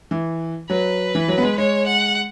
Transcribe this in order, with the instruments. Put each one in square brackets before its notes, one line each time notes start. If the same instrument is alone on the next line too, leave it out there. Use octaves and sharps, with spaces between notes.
[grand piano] E3
[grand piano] F#3 [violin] B4
[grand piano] E3
F#3
B3
G#3
[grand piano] G#3 [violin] C#5
[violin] F#5